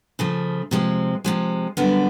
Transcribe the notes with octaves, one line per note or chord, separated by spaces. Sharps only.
C#3 F3 A3
C3 F3 G#3
C3 F3 G#3
F#2 D3 G3 B3